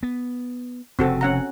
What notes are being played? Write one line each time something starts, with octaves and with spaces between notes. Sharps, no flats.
B3
F1 C#3 C4 F#4 A4
C#4 F#5 A#5